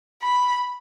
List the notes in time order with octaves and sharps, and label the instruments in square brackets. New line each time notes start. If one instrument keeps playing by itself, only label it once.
[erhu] B5